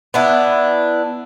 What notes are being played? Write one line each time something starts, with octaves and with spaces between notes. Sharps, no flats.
B3 D4 E4